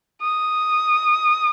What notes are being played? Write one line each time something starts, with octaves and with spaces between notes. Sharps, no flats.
D#6